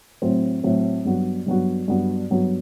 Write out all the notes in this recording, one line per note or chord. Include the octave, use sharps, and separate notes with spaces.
A2 F#3 C4
A2 F#3 C4
G2 F#3 B3 F#4
G2 F#3 B3 F#4
G2 F#3 B3 F#4
G2 F#3 B3 F#4